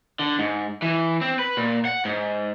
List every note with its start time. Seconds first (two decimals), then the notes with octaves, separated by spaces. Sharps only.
0.19 D3
0.39 G#2
0.82 E3
1.22 C4
1.39 B4
1.57 A#2
1.85 F#5
2.05 G#2